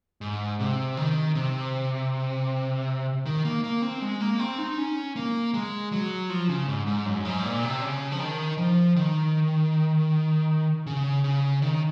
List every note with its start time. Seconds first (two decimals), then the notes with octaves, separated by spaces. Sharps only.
0.21 G#2
0.59 C3
0.97 D#3
1.35 C3
3.25 D#3
3.45 A#3
3.64 A#3
3.82 C4
4.02 G#3
4.21 A#3
4.39 C4
4.58 D#4
4.78 C#4
5.16 A#3
5.54 G#3
5.92 F#3
6.29 F3
6.49 C#3
6.68 G#2
6.87 G#2
7.06 F#2
7.25 G#2
7.44 A#2
7.63 C3
7.82 C#3
8.12 F3
8.20 D#3
8.58 F3
8.96 D#3
10.87 C#3
11.24 C#3
11.62 D#3